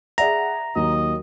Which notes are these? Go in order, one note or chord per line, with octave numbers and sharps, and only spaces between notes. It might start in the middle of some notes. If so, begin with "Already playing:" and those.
G#4 D5 E5 F#5 A#5
D#2 F#3 D#5